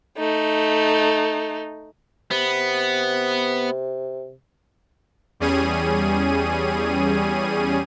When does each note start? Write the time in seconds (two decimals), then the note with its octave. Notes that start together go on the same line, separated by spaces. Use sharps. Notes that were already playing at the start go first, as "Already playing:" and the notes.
0.18 A3 D#4
2.31 C3 B3
5.40 E2 G3 C#4 G#4 D#7